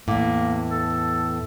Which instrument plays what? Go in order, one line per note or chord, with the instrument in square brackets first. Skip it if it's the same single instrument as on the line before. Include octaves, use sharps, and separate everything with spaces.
[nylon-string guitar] E2 A2 [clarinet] A#3
[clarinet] A4